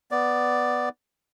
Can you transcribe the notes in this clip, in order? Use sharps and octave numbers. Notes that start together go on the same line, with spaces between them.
B3 D5